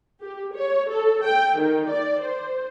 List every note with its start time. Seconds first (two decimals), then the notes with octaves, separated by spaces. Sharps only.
0.22 G4
0.55 C#5
0.90 A4
1.23 G5
1.57 D#3
1.89 D5
2.20 C5